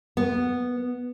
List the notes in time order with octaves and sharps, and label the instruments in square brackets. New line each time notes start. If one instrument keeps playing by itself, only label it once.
[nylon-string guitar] B3